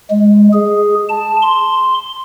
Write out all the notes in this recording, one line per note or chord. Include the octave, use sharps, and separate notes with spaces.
G#3
G#4
A5
C6